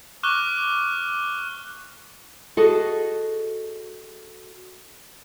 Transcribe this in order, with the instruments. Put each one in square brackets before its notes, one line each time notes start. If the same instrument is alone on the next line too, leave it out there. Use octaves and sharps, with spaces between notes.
[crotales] C#6 D6 F6 F#6 G7
[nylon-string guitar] F#4 G#4 A4 D#5